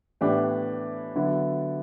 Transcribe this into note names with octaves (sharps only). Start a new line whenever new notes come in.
A2 E3 B3 D4 G4
D3 F#3 B3 E4